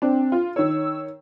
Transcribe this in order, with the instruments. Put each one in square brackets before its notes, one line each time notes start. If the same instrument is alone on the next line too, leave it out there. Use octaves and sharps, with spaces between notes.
[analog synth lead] C4 [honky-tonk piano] D4
[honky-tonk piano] F4
[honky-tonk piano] D#3 C#5 [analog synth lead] E6